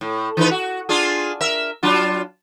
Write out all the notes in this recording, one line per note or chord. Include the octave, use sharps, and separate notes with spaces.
A2
E3 D#4 B4
F#4
D4 F4 G#4
A#4 E5
F#3 D4 F4